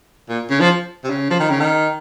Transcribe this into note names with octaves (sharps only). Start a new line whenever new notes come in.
A#2
C#3
F3
C3
C#3
F3
D#3
C#3
D#3